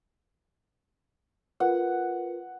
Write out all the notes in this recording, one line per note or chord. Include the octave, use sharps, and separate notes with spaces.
F4 A#4 B4 F#5